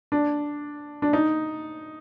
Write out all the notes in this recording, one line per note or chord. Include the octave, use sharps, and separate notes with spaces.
D4
D4
D#4